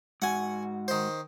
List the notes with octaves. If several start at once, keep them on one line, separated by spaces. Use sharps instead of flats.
G#2 F#4 F#5 G#5
D#3 C5